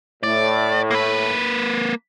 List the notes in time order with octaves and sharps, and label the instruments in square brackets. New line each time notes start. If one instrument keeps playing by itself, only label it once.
[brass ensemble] A2 [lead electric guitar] D5
[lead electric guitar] A#3 B4